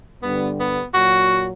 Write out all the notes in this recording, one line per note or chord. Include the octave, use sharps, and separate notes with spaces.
G2 D3 G3 B3
B3
A#2 F#3 F#4